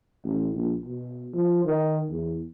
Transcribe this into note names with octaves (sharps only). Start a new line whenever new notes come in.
A1
A#1
B2
F3
D#3
E2